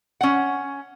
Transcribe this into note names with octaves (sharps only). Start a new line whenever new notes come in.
C#4 F#5